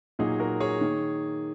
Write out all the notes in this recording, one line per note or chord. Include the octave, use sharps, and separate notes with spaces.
A#2 F#3 A#3 D#4 G#4
F#4 A#4
G#4 C#5
D#3 A#3